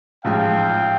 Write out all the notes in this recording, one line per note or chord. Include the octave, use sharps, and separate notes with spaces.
A1 G#2 F3 F5 G5